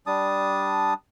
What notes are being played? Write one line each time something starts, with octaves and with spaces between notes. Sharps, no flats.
G3 D4 A5 D#6